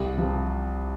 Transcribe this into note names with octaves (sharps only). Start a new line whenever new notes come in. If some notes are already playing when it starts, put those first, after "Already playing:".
Already playing: C2
C3 F3